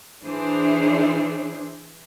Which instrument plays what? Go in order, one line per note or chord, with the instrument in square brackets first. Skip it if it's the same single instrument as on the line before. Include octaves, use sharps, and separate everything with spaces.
[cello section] E3 D4 G#4 C5